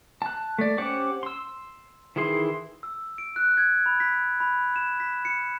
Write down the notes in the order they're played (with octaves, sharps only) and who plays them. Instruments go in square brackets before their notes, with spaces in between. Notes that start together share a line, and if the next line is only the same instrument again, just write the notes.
[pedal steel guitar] A5 F#6
A3 D5
C#4 G4 C5 F#5 D6
C6 E6
D#3 E3 E4 G#4 C6
[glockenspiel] E6
D7
F#6
G#6
B5
B6
B5
E7
B6
C#7